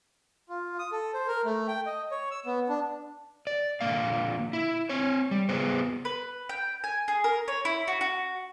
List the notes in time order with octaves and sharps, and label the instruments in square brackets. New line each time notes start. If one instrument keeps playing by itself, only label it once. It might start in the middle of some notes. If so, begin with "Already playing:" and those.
[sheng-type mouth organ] F4
D#6
A4
C5
A#4
A3
G5
D#5
C#5
E6
B3
D4
[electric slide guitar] D5
A#2 D3 F3 A#3 F5
E4
C4 C#5
G3
B3 G#4 C5
[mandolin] B4
G5
G#5
G#4
A#4
C#5
E4
F#4
F#4